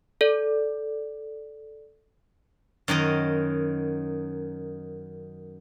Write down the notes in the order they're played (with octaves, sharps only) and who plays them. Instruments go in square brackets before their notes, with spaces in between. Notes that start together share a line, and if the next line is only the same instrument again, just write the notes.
[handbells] A4 D5
[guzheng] F#2 D#3 D#5